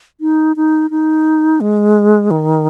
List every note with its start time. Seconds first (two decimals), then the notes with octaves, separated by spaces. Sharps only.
0.21 D#4
0.56 D#4
0.91 D#4
1.61 G#3
2.31 D#3